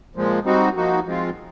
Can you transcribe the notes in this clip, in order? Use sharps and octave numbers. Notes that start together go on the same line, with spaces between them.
A#2 F3 G#3
G3 C4 D#4 F#4
F3 A#3 D#4 F#4
F3 G#3 C4 F4